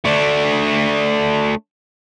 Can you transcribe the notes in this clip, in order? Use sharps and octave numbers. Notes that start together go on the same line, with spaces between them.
A3 D4